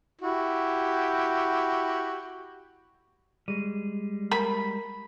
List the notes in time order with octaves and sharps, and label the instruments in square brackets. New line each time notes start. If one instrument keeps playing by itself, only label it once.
[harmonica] E4 F#4 G4
[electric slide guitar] G3 G#3 [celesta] G#4 D#7
[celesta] A#4 A#5 [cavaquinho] B5